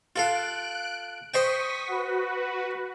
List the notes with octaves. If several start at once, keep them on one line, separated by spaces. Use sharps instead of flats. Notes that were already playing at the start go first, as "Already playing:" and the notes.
F4 A4 F5 F#6 D7
C5 D#5 G5 C#6 D#6 B6
F#4 B4